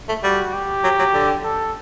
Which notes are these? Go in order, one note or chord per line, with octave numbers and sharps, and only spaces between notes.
A3
G3 F#4
G4
F#3
F#3
D3
A4